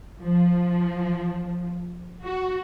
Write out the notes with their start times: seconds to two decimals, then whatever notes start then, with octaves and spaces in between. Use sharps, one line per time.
0.23 F3
2.24 F#4